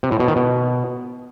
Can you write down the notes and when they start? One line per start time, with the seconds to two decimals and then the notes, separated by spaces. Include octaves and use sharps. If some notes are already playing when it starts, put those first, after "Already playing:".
0.03 C3
0.11 A2
0.20 B2
0.28 D#3
0.36 B2